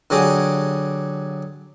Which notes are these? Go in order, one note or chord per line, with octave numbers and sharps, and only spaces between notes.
D3 F#3 G4 G#4